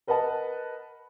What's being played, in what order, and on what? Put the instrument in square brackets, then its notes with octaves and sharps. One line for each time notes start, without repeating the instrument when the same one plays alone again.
[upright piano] A#4 B4 D#5 F#5 A5